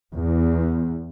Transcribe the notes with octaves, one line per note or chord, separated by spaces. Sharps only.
E2